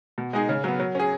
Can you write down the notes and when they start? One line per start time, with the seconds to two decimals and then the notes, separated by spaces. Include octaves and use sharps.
0.18 B2
0.33 G#3 D#4 G#4
0.49 C#3
0.64 F#3 B3
0.80 F#3
0.95 C#4 G#4